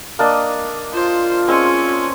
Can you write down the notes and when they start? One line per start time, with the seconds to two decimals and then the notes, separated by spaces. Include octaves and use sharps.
0.19 A#3 D4 D#5
0.94 F4 C5
1.48 G#3 C4 C#4